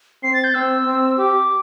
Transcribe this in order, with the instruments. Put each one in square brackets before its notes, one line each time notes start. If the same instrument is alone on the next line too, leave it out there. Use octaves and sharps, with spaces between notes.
[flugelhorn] C4 [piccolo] C7
[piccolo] A6
G6
[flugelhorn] C4 [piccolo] E6
[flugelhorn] C4
[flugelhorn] G4 [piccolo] D6